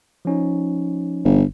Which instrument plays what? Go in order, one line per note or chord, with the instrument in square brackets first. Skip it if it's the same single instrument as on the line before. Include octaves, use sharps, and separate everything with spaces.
[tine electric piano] F3 C#4 D#4
[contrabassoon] G1